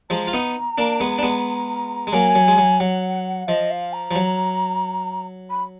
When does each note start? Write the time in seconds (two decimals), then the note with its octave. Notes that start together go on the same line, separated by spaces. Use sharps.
0.10 F3 G#3 A#5
0.27 F4
0.33 B3 D#4
0.78 A#3 D4
1.00 G#3 B3
1.18 D4
1.23 G#3 B3
2.07 G#3
2.13 F#3 A#3 G#5
2.35 F#3
2.48 G#3
2.58 F#3
2.80 F#3 F#5
3.48 F3 D#5
3.71 F5
3.93 A#5
4.11 F3
4.15 F#3
5.50 B5